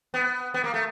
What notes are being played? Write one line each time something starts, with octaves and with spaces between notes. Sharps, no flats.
B3
B3
A#3
A3